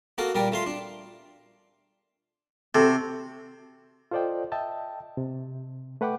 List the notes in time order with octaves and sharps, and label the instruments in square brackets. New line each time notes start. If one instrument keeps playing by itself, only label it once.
[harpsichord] A#3 F#4 A4 A#4
A#2 G3 A#4 D5
A3 F4 C6
D4
[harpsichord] C3 [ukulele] F#4 A4
[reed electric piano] F4 A4 C5 D5 D#5 G5
D#5 E5 G5 A5
C3
A3 B4 F#5 G5 D6